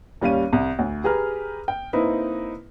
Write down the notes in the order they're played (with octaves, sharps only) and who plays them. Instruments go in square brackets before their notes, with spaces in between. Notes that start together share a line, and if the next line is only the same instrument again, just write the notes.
[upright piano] D#2 G3 C#4 F5 D#7
C2
D2
G4 G#4 B4 A#5 F6
G5
A#3 C4 D#4 E4 B4